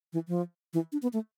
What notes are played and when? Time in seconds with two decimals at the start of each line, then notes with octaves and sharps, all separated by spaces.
0.13 E3
0.28 F3
0.73 E3
0.92 D4
1.02 B3
1.13 A3